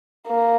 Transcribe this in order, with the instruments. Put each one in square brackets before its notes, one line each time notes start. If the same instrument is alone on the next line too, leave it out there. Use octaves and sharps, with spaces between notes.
[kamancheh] A#3